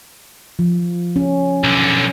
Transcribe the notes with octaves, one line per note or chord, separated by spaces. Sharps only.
F3
C#4
B1 D3